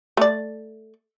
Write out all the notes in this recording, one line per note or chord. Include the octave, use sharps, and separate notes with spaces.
A3 D5